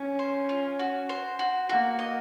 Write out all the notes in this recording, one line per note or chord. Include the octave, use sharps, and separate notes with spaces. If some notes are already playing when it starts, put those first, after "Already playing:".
Already playing: C#4
C5
F4
F#4
C5
F#4
A#3 F#4
D#5